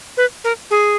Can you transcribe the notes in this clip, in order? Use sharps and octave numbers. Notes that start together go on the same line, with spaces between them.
B4
A#4
G#4